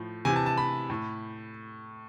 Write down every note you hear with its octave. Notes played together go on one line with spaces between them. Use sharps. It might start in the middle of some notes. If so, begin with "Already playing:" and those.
Already playing: A2 F3
C3 E3 G#5
A5
A5
B5
A2